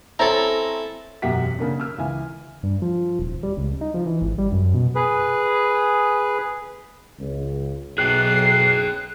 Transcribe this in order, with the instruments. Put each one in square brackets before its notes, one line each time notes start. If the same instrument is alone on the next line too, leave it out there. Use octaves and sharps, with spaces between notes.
[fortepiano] C4 C#4 A#5 [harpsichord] E4 A4
[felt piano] E1 F#2 G4 E5 F#5 B6
C#3 A#3 D4
E6 F6
C#2 E3 G#5
[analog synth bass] G2
F3
D#1
G3
C#2
D#4
F3
E3
G#1
G3
F#2
B2
[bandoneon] G#4 B4
[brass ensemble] C#2
[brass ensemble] B1 [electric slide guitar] G#4 C#5 G5 [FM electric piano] F#6 [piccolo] C7